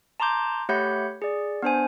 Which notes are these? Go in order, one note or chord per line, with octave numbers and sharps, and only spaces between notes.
A5 A#5 C6 D6 G6
A3 G4 C#5 F#5 B5 G6
G#4 D5
B3 D4 C5 G#5